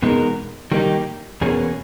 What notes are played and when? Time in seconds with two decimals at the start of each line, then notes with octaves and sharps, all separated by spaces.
0.02 E2 B2 G#3 D#4 A#4
0.72 D#3 G3 A#3 D#4 G4
1.41 E2 B2 A#3 C#4 G#4